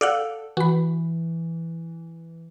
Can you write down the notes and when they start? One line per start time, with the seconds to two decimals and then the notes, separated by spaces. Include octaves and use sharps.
0.01 A4 D5 F5 F#5
0.57 E3 F#4 B5